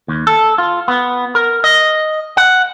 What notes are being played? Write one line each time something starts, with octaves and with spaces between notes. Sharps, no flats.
D#2
A4
F4
B3
A#4
D#5
F#5